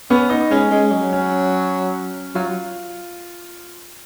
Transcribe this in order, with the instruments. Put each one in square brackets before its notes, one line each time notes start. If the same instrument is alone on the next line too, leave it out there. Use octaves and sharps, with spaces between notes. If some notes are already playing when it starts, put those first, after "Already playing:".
[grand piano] B3 [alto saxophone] C#4
[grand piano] D#4
[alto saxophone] G#3 [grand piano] C#4
[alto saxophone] G#3
F#3
[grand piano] C#4
[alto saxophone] F#3 [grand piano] F4